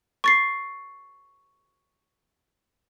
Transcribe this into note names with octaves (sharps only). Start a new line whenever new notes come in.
C#6 A6 C7